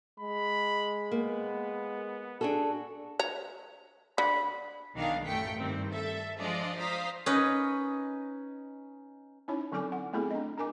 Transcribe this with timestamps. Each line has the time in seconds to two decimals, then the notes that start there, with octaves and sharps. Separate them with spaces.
0.20 G#3 B5
1.12 A#3 B3
2.41 D4 F#4 G#4 A4
3.19 C#5 A#5
4.18 D3 B5
4.95 B1 D#3 D4 G#4 F5
5.25 A1 F#2 A3 G5 B6 C#7
5.58 G2 D#3 C4
5.90 A4 E5
6.39 F3 G#3 D4 F4 D5 D#5
6.77 C5 F5 A#5 D#6 B6
7.26 C#4 D#4 B4 D#5
9.48 C#4 D#4 E4 C#5
9.72 D3 F#3 C4 A4 G#5 D6
9.92 F#5
10.13 A3 B3 C4 E4 G#4 A4
10.31 D4 D#5
10.58 D4 A#4 G#5 D6